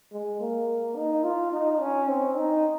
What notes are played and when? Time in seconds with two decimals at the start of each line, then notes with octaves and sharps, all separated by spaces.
0.12 G#3
0.40 A#3
0.96 D#4
1.24 F4
1.52 D#4
1.80 C#4
2.08 C4
2.36 D#4